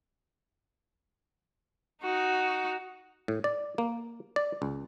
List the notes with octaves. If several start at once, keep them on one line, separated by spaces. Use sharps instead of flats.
D#4 F#4
A2
D5
A#3
D5
C#2